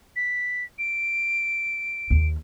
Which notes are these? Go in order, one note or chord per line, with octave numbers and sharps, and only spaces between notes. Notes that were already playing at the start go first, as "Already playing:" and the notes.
B6
D7
D#2